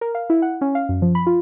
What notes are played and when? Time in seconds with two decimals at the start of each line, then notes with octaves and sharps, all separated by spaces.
0.01 A#4
0.15 F5
0.30 E4
0.42 F#5
0.61 C#4
0.75 F5
0.89 F#2
1.02 F3
1.15 B5
1.27 F4